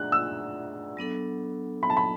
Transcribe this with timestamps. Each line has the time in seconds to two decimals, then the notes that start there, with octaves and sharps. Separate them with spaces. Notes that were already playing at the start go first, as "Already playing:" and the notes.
Already playing: A3 D4 G#4 D5 F#5 F#6
0.12 E6
0.97 F#3 B3 D4 A4
1.83 B5
1.90 A5
1.97 B5